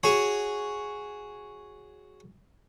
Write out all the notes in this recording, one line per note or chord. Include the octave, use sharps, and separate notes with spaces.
F#4 G#4 C#5 G#5